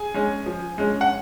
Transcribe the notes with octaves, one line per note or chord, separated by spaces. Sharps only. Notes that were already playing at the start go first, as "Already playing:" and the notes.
Already playing: G#4 G#5
G#3 C#4
F3
G#3 C#4
F#5